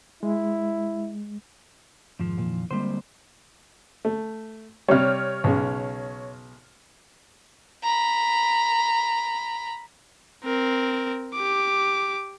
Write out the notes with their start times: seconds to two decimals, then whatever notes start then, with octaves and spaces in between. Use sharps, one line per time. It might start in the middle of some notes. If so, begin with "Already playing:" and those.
0.23 G#3 E4
2.19 F2 G#2 D#3 F3 G#3
2.37 A#2 D#3 E3 A#3
2.71 D3 G3 G#3 A#3 C4 C5 C6
4.05 A3
4.88 C3 G3 C#5 F6
5.44 B1 C#3
7.84 A#5 B5
10.44 C4 A#4
11.34 G4 D6